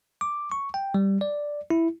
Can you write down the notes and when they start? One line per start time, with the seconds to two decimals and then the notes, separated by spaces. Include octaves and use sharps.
0.21 D6
0.52 C#6
0.74 G5
0.94 G3
1.21 D5
1.70 E4